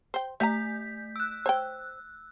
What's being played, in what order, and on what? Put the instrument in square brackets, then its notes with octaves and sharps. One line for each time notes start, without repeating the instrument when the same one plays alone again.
[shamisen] C5 G5
[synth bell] A3 G6 B6 [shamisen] E5 F#5 A#5
[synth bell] E6 F#6
[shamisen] C5 C#5 G5